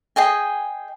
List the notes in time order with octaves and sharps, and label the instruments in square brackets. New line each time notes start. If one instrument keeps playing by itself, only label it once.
[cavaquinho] G#4 D#5 G5 G#5